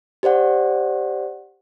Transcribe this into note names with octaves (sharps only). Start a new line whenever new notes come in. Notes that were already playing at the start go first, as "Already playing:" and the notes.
G4 C5 D5 F#5